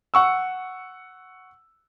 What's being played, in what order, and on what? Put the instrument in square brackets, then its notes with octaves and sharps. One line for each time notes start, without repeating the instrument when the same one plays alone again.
[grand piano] F#5 C#6 E6